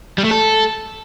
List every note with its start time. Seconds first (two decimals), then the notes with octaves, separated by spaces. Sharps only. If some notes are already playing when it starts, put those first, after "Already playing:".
0.18 G3
0.24 A3
0.31 A4